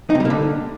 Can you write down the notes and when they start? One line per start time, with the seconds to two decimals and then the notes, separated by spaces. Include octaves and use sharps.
0.10 D#4
0.15 C3
0.20 G3
0.25 A#3
0.30 D3